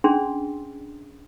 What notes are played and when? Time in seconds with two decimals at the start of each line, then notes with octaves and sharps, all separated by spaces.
0.04 C#4 D4 G#4 C6